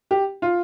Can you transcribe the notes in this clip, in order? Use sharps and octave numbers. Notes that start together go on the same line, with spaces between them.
G4
F4